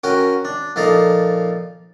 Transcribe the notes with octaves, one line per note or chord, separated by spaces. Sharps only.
C#4 F#4 A#4 G5 G#5
D4
A#2 F3 D#4 A4 D5 F5